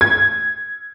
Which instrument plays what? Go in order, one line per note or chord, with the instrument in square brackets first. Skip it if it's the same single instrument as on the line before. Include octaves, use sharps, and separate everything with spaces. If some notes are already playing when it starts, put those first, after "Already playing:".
[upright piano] G#6